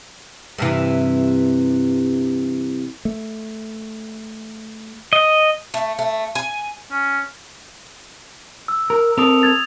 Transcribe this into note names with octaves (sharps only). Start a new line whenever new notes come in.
G2 C3 E3
A3
D#5
A3
A3
G#5
C#4
E6
A#4
C4 A4 A#4 D#6 F7
G#6 A6 F7